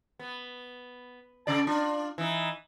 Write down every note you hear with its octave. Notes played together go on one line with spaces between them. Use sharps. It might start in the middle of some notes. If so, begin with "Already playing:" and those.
B3
C#3 A4 D5
D4 F4
E3 D#4